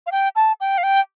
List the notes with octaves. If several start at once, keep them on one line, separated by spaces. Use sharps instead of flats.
F5
G5
A5
G5
F5
G5